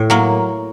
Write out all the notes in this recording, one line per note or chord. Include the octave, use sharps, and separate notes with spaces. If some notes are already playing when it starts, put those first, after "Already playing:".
Already playing: A2
F#3 A#3